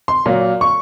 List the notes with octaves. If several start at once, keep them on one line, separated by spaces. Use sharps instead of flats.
C6
A#2 F#3 A#3
C#6